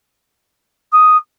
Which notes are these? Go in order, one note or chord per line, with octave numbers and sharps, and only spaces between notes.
D#6